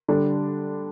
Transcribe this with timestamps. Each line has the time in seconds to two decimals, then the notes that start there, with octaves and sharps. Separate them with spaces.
0.08 D3 G3 D4